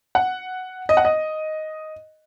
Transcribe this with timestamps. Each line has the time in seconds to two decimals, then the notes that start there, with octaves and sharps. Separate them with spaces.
0.15 F#5
0.89 D#5
0.97 F#5
1.05 D#5